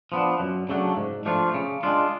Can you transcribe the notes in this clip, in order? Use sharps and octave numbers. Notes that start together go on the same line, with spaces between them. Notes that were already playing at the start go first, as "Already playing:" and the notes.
F3 B3 D4
F#2
C#3 F#3 A3 D4
G#2
F3 A3 D4 F4
C#3
G#3 D4 F4